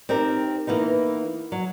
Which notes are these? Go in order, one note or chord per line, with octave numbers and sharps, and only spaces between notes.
C4 D#4 G4 A#4
E3 A#3 B3 D#4
F#3